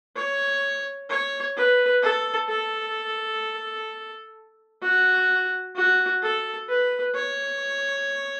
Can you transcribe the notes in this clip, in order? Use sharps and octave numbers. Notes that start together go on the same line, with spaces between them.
C#5
C#5
B4
A4
A4
F#4
F#4
A4
B4
C#5